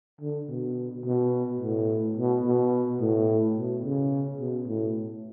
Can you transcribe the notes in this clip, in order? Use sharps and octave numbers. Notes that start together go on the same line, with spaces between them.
D3
B2
B2
A2
B2
B2
A2
B2
C#3
B2
A2